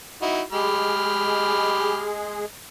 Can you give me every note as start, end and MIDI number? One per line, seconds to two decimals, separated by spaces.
0.22 0.41 63
0.22 0.41 64
0.22 0.41 66
0.52 2.45 56
0.52 2.08 67
0.52 2.45 68
0.52 2.08 83
0.52 2.08 89